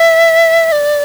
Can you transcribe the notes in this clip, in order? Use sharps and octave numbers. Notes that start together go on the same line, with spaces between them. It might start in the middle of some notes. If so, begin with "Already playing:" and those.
Already playing: E5
D5